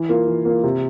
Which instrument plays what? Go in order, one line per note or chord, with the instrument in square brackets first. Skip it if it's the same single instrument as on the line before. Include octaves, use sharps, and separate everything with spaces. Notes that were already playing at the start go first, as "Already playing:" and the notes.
Already playing: [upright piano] E3
A#3 F4
E3
A#3 F4
C3